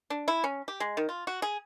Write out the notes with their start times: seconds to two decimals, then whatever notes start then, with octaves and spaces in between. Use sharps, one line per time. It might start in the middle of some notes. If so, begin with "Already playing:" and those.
0.10 D4
0.28 E4
0.44 C#4
0.68 G4
0.80 G#3
0.97 D#3
1.09 F4
1.27 F#4
1.42 G#4